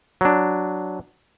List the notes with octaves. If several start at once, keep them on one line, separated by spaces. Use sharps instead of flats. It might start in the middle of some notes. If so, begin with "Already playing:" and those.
F#3 D4